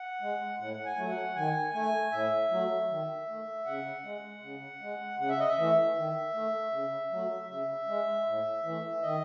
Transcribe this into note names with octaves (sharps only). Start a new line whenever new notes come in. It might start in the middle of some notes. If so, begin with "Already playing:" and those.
Already playing: F#5
G#3
A2 F#5
F#5
G#5
F#3 A3
F#5
D#3 G#5
A3 G#5
A2 E5
F#3 A3
D#3
A3
C#3 F#5
G#3
C#3
G#3
C#3 F#5
E5
D#5
E5
E3 A3
D#3
A3
C#3
F#3 A3
C#3 E5
G#3
A2
E3
A3
D#3 D#5